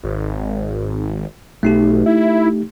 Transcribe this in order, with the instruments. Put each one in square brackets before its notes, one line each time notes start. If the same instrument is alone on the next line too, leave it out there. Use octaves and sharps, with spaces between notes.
[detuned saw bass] G#1
[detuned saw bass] B1 [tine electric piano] A3 D#4 G4
[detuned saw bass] E4